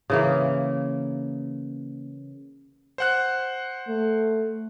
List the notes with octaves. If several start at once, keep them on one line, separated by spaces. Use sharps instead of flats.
C#3 E3 A#3
C5 F#5 F#6
A3